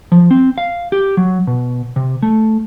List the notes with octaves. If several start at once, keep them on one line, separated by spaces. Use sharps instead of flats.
F3
C4
F5
G4
F#3
B2
C3
A3